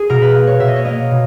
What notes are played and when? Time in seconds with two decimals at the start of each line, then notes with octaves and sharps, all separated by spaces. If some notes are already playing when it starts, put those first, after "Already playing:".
Already playing: G#4
0.09 B2 A#4
0.22 B4
0.35 A#3
0.47 C#5
0.59 B2 E5
0.68 D#5
0.76 C#5
0.85 A#3 D#5
1.11 B2